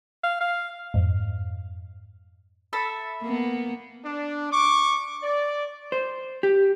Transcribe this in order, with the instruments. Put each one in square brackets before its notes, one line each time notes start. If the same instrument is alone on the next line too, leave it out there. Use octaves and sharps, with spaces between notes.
[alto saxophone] F5
F5
[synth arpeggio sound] F2 G#2
[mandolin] A4 E5 B5
[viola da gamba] A#3 B3
[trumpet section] D4
C#6 D6
D5
[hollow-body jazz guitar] C5
G4